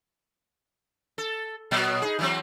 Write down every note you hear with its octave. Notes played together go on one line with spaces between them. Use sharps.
A4
A#2 F#3 B3
D#4 G#4
E3 F#3 C4